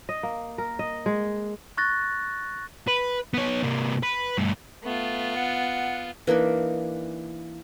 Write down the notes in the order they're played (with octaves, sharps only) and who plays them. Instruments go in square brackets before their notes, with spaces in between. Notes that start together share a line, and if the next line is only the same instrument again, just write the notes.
[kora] D#5
A#3
A#4
D#5
G#3
[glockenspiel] C#6 F#6 A6 A#6
[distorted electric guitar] B4
B3 C#5
C3 A#3
B4
G2 A3
[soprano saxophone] A3 [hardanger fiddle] B3 F4
[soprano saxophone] F#5
[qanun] E3 A#3 D4 D#4